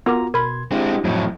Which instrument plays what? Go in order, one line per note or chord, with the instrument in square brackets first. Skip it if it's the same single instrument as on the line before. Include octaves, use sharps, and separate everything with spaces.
[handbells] B3 A#4 D6 [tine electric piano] F4 F#4 A#5
[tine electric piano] B2 C6 G#6 [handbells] A#4 B5
[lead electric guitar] G#3 C4 [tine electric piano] D4 E4 G4
[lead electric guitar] F2 A2 [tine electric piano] F#3 A3 E4